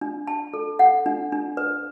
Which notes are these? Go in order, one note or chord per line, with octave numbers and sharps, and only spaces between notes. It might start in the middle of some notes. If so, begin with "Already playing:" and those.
D4
A5
A4
F#5
D4
D4
B4